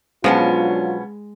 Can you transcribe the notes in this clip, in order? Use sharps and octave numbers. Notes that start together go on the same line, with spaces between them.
B2 F3 F#3 G#3 B3 C#4 D4 F4